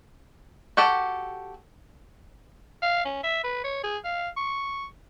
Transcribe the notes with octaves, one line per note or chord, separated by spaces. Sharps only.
F#4 G4 A4 G5
F5
C#4
E5
B4
C#5
G#4
F5
C#6